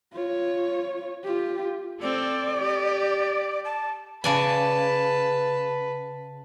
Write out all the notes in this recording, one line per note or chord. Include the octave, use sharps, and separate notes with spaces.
F4 C#5
F4 G4
C4 A4 D5
G4
A5
C#3 B4 D5 G#5 A5